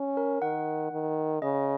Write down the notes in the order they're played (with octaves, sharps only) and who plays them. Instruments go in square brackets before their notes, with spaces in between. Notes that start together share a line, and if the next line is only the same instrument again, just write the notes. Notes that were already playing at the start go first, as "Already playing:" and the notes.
Already playing: [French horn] C#4
[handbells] A#4
[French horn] D#3 [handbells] F#5
[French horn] D#3
[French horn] C#3 [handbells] D#5